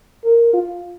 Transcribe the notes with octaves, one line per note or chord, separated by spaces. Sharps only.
A#4
F4